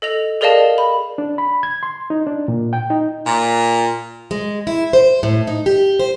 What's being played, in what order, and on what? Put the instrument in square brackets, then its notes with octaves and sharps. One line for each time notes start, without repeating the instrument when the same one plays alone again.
[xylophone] A4 D#5 F7
G#4 A#4 D5 D#5 F5 A5
B5
[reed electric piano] D4
B5
G#6
C6
D#4
D4
A#2
G5
D#4
[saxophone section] A#2
[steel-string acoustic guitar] G#3
E4
C5
A2
D#4
G4
C5